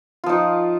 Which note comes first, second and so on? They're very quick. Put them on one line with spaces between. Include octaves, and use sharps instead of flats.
F4 F3 D#4